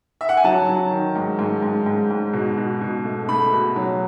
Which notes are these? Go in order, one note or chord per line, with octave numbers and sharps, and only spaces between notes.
E5
F#5
G#5
F#3 A5
F#3
D#3
G#2
G#2
G#2
G#2
G#2
B2
B2
B2
A3
A3 B5
B2
F#3